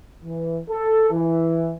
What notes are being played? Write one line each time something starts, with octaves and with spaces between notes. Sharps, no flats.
E3
A4
E3